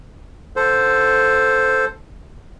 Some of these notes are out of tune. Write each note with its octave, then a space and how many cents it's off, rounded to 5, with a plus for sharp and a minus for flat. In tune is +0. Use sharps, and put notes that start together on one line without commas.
D3 +0 A4 +0 C5 +0